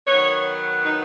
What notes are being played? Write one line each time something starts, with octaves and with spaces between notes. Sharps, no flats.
D#3 F#3 B3 C#5
D#4